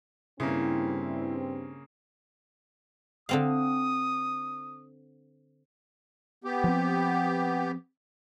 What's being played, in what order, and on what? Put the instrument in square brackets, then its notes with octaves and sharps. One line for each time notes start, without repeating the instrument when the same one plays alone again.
[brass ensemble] G2 C4 [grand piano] C#3 A#3 [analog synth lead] E4
[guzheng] D3 C4 F5 [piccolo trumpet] D#6
[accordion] B3 G4
[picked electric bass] F3 C4